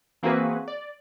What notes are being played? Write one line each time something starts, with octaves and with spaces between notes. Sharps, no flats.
E3 A#3 C4 F#4 G#4 B4
D5